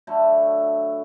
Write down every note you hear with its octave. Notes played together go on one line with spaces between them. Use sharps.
D3 F#3 A3 E4